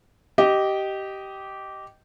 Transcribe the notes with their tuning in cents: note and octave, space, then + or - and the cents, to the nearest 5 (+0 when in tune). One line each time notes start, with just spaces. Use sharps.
G4 -15 D#5 +0